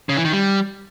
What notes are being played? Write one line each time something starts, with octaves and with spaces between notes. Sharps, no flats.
C#3
E3
D#3
G3